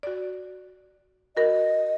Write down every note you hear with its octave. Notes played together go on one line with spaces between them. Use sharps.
F#4 D5
F#4 A#4 D#5